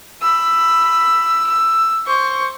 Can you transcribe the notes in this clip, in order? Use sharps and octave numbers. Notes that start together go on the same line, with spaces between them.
B5 E6
E6
C5 C#6